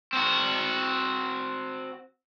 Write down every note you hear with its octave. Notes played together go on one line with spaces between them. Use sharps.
C4 F#4